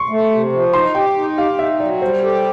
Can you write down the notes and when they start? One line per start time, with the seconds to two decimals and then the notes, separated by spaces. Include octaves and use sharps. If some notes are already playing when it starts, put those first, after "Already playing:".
Already playing: C6 C#6
0.09 A3
0.31 C3
0.52 F3
0.73 D#4 C6
0.95 G4 G5
1.17 D#4
1.37 G4 F5
1.59 D#4 E5
1.80 F#3 D5
2.02 G3 C5
2.23 G4 A4